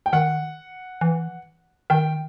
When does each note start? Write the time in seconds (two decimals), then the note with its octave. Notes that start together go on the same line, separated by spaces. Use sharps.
0.06 G5
0.13 D#3 F#5
1.01 E3
1.90 D#3 G5